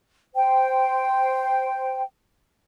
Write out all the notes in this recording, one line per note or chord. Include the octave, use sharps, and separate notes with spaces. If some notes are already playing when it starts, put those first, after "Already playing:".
C5 G5